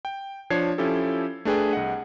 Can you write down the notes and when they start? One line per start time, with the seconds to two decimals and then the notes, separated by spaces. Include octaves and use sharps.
0.05 G5
0.50 F3 D4 C#5 G#6 C7
0.78 F3 C#4 E4 G4 A4
1.45 A3 D4 G#4 B4 G5
1.73 C2 D#5 F#5